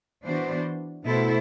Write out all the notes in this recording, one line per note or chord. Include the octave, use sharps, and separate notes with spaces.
E3 B3 D4 F#4 C5
B2 A3 E4 A4 C5